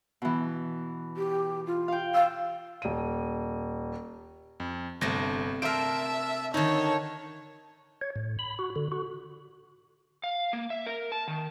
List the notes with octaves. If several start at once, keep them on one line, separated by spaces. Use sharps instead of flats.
B2 E3
G4
F4
F5 G5
F5 E6
D#1 D#7
F2
G1 C3 A3 D4 A#6
A#4 C5 E5 A5 F6 D7
D3 D#3 D#4 C#5 A5
C#5
A2
B5
F#4
D3
F#4
F5
A#3
E5
A#4
A5
D#3